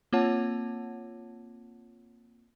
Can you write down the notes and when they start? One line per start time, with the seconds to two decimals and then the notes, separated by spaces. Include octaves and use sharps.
0.13 A#3 C4 F4 C#5 F#5 A5